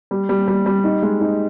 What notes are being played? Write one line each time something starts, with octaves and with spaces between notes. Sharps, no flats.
G3
G3
G3
G3
D#4
G#3
D#4